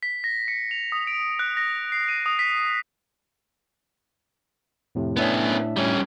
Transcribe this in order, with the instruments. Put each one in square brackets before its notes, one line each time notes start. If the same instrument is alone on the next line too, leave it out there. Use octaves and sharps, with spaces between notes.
[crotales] B6
A#6
C#7
F7
D#6
D7
F#6
A#6
C7
D#7
D#6
B6
[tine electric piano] F2 A2 C3
[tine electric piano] A2 D4 E5 [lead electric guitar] B3 C#4
[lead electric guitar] G3 C#4